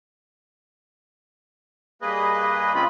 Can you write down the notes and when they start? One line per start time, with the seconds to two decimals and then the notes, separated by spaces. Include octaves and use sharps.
2.02 G2 A#3 G#4 B4 D#5
2.75 C#3 G#3 C4 C#4 F4 B5